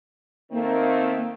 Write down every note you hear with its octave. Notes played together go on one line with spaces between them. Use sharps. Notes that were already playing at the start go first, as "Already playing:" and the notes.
D#3 A3 A#3 C4